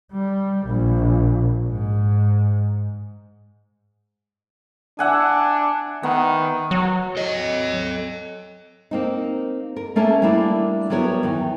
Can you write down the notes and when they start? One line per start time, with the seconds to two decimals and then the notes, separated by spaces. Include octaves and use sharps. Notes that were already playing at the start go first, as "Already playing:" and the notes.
0.13 G3
0.67 A#1
1.69 G#2
4.99 D4 E5 F#5 G#5
6.03 D#3 B3
6.71 F#3
7.17 A4 D#5
8.91 A#3 C4 D#4
9.76 A#4
9.96 A3 A#3 C#4 A#4 E5 A5
10.22 G3 A3 A#3 D4 E4
10.90 F#3 G3 B3 A#4 C#5
11.23 E2 D#3 G5